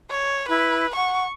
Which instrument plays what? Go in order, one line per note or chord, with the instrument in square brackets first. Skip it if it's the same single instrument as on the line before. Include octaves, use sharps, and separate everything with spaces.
[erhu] C#5
[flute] E4 [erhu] B4
[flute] F#5 [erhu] C#6